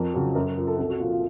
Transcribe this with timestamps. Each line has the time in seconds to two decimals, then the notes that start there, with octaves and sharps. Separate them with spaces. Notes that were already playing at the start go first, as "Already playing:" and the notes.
Already playing: F2 A#4
0.14 C#3 F#3
0.35 F#2 A#4
0.46 A#4
0.57 F3 A#4
0.67 A4
0.78 C2 A4
0.90 F#4
1.00 A#2 F3 F4
1.11 F4